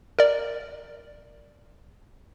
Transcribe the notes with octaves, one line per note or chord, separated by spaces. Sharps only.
A#4 D5